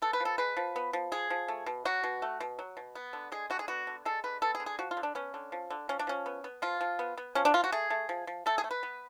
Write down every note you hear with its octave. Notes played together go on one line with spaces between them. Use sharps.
B3 A4
B4
F3
A4
G#3 B4
F3
B3
F3
G#3 G#4
F3
A3
B2
F#3 F#4
B2
A3
B2
F#3
B2
B3
D3
G#3 G#4
D3 F#4
G#4
B3 F#4
D3
G#3 A4
D3 B4
B3 A4
G#4
D3
G#4
F3 F#4
F4
D3
D4
B3 C#4
D3
F3
D3
F3 C#4
D4
F3 C#4
B3
B3
F3 F4
F3
B3
B3
F3 C#4
D4
F3 F4
F#4
A3 G#4
A3
F3
F3
A3 A4
G#4
A3
B4
B3